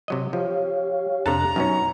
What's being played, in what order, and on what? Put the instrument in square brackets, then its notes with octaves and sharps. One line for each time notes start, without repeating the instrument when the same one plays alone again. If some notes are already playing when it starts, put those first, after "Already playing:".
[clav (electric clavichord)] C3 F#3 D#5
[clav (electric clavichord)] F3 [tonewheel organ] G4 C#5 F5
[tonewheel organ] F2 D4 F#6 [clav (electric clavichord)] C3 A4 A5 [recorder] A#5
[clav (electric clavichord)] F#2 B2 C#4 [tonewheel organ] D#4 C#6